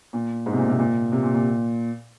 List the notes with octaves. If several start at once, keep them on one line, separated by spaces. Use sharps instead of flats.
A#2
G#2
C3
A#2
C3
A#2
C3
A#2
A#2